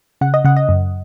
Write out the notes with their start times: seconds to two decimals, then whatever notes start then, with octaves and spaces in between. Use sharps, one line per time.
0.21 C#3 F#5
0.34 D#5
0.45 C#3 F#5
0.56 D#5
0.69 F#2